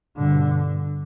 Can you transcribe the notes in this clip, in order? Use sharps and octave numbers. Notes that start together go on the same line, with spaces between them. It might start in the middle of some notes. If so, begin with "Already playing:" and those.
G2 B2 D3